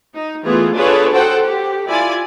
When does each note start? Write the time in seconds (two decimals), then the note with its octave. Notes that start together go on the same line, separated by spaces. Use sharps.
0.14 D#4
0.44 E3 A3 B3 F4 G#4
0.74 D4 F4 G#4 A4 B4 C#5
1.12 F#4 A4 C5 F#5 G5
1.44 G4
1.87 E4 F4 D5 G#5